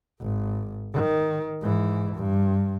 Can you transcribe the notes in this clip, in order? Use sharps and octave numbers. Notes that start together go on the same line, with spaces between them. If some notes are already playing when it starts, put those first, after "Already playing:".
G#1
D#3
G#2 E3
G2